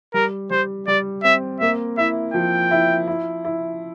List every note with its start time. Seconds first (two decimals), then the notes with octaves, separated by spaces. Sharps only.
0.14 G3 A#4
0.51 G3 C5
0.87 G3 D5
1.24 C4 E5
1.60 A#3 E5
1.97 E4 E5
2.34 F3 G5
2.71 E4
3.07 E4
3.45 E4